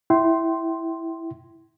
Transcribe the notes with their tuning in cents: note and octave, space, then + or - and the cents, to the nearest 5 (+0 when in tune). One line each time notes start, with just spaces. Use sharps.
E4 +0 G5 -30 C6 +0